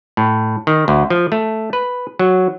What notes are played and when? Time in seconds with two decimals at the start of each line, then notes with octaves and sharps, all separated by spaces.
0.17 A2
0.67 D#3
0.88 D2
1.10 F3
1.32 A3
1.73 B4
2.19 F#3